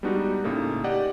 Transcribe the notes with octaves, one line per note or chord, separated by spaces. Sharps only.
G3 G#3 B3 D4 D#4 F#4
A2 C#3 A#3 D#4 A4
G4 D5 D#5 F#5